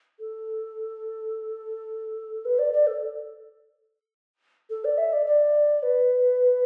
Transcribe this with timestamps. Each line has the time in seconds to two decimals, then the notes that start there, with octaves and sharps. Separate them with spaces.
0.20 A4
2.45 B4
2.59 D5
2.73 D5
2.87 A4
4.70 A4
4.85 D5
4.98 E5
5.13 D5
5.26 D5
5.83 B4